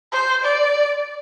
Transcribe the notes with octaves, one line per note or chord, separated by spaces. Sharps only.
C5
D5